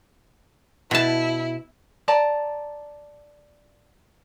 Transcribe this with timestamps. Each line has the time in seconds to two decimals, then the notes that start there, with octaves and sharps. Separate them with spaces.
0.91 B2 E4 A5
2.08 D5 A5 A#5